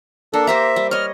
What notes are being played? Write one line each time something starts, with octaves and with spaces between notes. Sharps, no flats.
A#3 D4 A4
G4 C5 E5 A#5
G3
C#5 D#5 F6